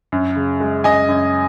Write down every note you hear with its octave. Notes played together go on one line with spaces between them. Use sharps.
F#2
C#3
G#3
F#2 D#5 G#5
F#2